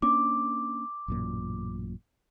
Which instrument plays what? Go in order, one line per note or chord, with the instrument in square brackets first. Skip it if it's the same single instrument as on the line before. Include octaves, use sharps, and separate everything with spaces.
[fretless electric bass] A#3 C#4 D4 [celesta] D6
[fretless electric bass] A1 F#2 A#2